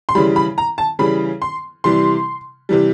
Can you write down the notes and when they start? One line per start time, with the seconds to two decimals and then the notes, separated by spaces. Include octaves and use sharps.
0.09 C6
0.15 C#3 E3 G3 B5
0.36 B5
0.58 A#5
0.78 A5
0.99 C#3 E3 G3 B5
1.42 C6
1.84 C3 E3 G3 C6
2.69 C3 E3 G3